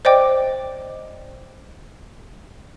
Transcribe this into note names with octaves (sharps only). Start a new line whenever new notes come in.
C5 D5 D#5 G5 D6